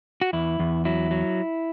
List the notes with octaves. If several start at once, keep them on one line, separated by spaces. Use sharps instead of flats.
F#4
E2 E4
E2
F#3 E4
F#3